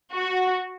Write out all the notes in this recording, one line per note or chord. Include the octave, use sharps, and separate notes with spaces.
F#4